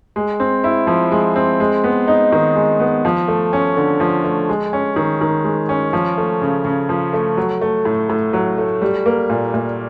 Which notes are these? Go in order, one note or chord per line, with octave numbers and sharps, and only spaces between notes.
G#3
C4
E4
F3
G#3
C4
G#3
B3
D#4
D#3
G#3
B3
F3
A3
C#4
D3
F3
A3
G#3
C#4
D#3
D#3
G#3
C#4
F3
A3
C#3
C#3
F3
A3
F#3
A3
A2
A2
F#3
A3
G3
A#3
A#2
A#2